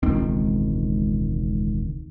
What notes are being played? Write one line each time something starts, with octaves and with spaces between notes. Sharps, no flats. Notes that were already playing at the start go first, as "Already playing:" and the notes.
E1 C#2 D#3 C4